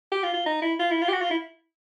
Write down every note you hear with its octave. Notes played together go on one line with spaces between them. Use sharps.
G4
F4
F4
D#4
E4
F4
E4
F4
G4
F#4
F4
E4